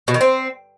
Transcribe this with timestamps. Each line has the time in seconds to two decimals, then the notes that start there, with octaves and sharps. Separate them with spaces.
0.08 B2
0.14 D#3
0.21 C4